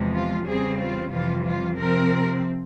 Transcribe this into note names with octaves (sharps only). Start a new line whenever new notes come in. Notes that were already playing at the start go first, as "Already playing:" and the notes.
Already playing: E2 C3 F3 G#3
F4
E2 C#3 G3 C4 G#4
F4
F2 C3 E3 G3 F4
F4
C3 F3 C4 A#4